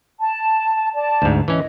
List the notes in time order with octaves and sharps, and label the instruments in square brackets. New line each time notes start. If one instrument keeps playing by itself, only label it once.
[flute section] A5
D5 A5
[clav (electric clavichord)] D2 G#2
[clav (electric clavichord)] E3 C#4 [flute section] D#5